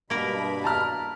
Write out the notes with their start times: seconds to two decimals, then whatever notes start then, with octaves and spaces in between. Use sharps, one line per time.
0.10 G2 B2 A#3 A#4 B5
0.64 A5 A#5 F6